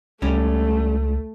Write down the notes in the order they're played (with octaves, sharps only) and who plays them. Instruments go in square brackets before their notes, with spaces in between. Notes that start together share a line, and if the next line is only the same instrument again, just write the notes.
[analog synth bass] C#2 [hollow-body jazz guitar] G3 C#4 [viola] A3